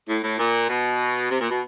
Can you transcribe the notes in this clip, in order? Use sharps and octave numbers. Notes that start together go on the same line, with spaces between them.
A2
A2
A#2
B2
C3
A#2
B2